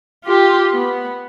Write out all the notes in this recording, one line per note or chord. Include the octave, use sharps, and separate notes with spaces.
F4 G4
B3